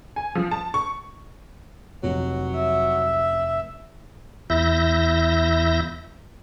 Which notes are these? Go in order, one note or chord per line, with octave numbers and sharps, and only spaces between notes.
G#5
F3
A5
C#6
F1 F#3
E5
E2 E4 E5 G6 A#6